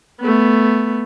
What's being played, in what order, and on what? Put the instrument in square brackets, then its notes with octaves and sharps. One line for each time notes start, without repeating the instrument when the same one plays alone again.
[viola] A3 B3